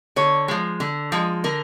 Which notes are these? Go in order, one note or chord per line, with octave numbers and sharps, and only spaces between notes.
D3 C#5
F3 G#3
D3
F3 G#3
D3 A#4